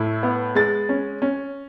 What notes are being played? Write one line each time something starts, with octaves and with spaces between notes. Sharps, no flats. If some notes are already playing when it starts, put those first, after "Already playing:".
Already playing: A2 E4
B3
G#3 A6
C#4
C#4